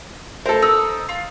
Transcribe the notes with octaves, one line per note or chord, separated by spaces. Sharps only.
A4 A#4 C5
D#4 E6
F4